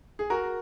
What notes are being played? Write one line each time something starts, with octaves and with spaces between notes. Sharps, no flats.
G#4
F#4 A#4